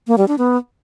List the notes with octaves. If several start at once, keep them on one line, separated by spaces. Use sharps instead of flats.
A#3
G3
D4
B3